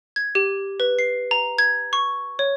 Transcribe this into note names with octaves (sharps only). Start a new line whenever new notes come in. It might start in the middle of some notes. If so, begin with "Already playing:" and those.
G#6
G4
B4
C7
A#5
G#6
C#6
C#5